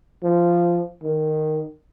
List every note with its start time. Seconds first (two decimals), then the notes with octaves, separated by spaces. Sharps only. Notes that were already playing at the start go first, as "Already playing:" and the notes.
0.23 F3
1.03 D#3